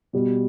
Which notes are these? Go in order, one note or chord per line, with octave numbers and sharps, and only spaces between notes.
B2 G3